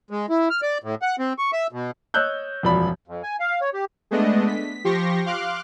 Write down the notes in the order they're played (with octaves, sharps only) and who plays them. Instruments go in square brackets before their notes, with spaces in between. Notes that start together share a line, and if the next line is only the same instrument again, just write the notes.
[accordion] G#3
E4
F6
D5
A2
F#5
C4
C#6
E5
B2
[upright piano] C#5 D#5 E6 F#6 G6
E1 F#2 F3 D5 B5
[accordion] F2
G#5
F5
C#5
G4
[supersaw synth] G#3 A3 B3 D4 D#5
B6
F3 G4 C6 C#6 A#6
F5 C6 D6 F6 F#6